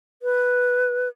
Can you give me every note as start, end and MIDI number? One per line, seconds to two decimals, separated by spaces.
0.22 1.09 71